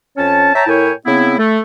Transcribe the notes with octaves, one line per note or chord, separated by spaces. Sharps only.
F2 C#4 C#5 A5
C#5 E5 G5 A5 A#5
A2 E4 A#4 C#5 G5 G#5
C#3 B3 C4 E4
A3